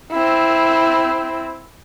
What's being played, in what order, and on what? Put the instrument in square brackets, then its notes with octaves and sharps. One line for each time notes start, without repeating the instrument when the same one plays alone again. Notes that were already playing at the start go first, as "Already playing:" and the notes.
[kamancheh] C4 E4